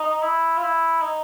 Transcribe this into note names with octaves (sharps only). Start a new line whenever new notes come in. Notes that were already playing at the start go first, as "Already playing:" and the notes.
Already playing: D#4
E4
F4
E4
D#4